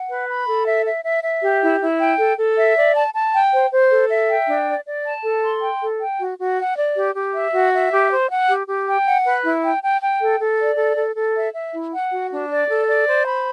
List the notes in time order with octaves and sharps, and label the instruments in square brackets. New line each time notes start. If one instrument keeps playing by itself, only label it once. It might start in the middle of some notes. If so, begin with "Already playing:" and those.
Already playing: [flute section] F#5
B4
B5
A4
E5
E5
E5
E5
G4
E4
E4
G5
A4
A4
E5
D5
A5
A5
G5
C5
C5
A4
E5
G5
D4
D5
D5
A5
A4
C6
G5
A4
G5
F#4
F#4
F#5
D5
G4
G4
E5
F#4
E5
G4
C5
F#5
G4
G4
G5
F#5
B4
E4
G5
G5
G5
A4
A4
D5
A4
A4
A4
E5
E5
E4
F#5
F#4
D4
D5
A4
D5
C5
B5